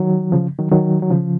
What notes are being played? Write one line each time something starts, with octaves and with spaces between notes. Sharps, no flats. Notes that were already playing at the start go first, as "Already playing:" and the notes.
Already playing: D#3 F#3
C#3 F3
D#3 F#3
D#3 F#3
F#3
C#3 F3